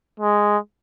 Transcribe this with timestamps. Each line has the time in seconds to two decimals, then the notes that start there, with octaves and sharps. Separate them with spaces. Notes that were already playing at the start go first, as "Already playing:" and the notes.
0.20 G#3